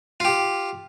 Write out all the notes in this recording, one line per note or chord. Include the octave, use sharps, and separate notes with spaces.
F4 G4